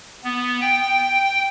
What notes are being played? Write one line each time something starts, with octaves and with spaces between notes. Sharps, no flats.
B3
G5